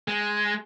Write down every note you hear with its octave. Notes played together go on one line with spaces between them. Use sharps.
G#3